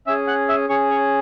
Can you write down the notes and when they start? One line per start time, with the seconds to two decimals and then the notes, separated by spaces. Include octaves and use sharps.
0.07 C#4 G#4 E5 E6
0.27 F#5 F#6
0.49 E5 E6
0.69 C#4 G#4 C#5 C#6
0.90 C#5 C#6